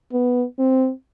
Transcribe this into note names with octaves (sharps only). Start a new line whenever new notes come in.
B3
C4